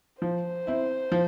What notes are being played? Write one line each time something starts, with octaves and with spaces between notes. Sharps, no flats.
F3 C5
C4 E4
F3